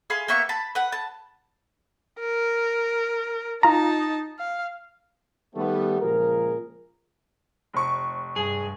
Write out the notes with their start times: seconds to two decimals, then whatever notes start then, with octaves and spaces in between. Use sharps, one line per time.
0.10 G#4 F5 B5 C6
0.28 A#3 B3 E5 C#6
0.49 A5 B5
0.75 B4 F#5
0.92 A5
2.19 A#4
3.63 D#4 F4 A5 A#5
4.39 F5
5.55 D#3 G3 A3 B3
6.00 C#2 A#2 F3 G#4 A#4
7.74 F1 C#6
8.36 G2 G#4